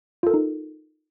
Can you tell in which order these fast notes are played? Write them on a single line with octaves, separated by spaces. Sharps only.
F4 A4 A#4 D#4